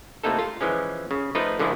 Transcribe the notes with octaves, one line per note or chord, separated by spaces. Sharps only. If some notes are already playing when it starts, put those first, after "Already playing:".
A2 C3 A3 A#3 D#4 A4
F4
E3 F3 G#3 C#4
C#3
F3 A3 D#4 F4 B4
G#2 D3 D#3 F3 E4